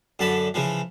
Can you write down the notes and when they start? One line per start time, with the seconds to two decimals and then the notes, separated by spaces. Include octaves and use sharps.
0.19 F#2 D3 A5 B5
0.54 C#3 E3 F3